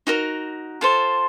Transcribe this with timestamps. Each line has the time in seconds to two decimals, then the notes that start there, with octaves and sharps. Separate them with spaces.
0.07 D#4 F#4 A#4
0.81 F4 A4 C5